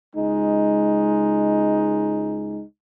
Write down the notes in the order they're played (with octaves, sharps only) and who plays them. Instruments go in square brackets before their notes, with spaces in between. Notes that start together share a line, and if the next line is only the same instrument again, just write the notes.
[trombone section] C#2 G#3 D#4